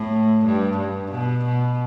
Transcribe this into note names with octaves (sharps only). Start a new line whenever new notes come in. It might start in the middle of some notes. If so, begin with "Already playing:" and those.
Already playing: A2
G2
G2
B2
B2